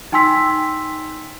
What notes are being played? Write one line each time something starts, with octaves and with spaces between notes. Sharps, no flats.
D#4 G5 G#5 C6 E6 B6